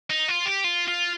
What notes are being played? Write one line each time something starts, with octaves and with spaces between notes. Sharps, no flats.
D#4
F4
G4
F4
F4